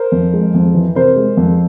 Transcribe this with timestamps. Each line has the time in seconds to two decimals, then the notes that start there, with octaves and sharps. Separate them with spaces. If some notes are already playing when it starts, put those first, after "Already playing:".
Already playing: A#4 C5
0.12 F2
0.33 G#3
0.54 F2
0.74 E3
0.95 C3 A#4 C5
1.16 G#3
1.37 F2